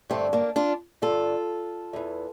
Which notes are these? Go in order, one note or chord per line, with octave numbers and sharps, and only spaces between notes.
G2 D3 A3 C4
A#3 D4
D4 F4
G2 D3 F4 A4
E2 E3